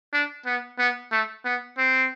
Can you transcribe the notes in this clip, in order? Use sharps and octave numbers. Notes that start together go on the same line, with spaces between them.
D4
B3
B3
A3
B3
C4